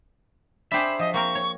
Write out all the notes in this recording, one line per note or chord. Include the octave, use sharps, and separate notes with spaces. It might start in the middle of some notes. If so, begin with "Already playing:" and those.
D4 G4 G#4 C5 E5 B5
F3 D#5
A#3 C4 A#4 C#6
C#5